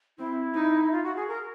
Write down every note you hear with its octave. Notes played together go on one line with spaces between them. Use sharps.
C4 E4
D#4
E4
F4
F#4
G#4
A#4